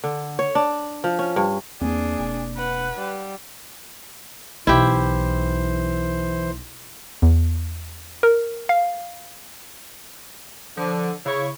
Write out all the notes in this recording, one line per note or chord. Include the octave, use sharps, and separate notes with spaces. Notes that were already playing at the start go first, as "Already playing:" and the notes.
D3
C#5
D4
F3
C#4
G2
E2 A#3 C4 D4 G#4
E1
B4 F#5
G3
B1 E3 E4 G4 C5
E2
A#4
F5
D3 F3
C#3 E4 C#5